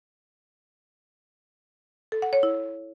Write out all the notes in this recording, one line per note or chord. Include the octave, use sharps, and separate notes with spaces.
A4
F#5
C#5
E4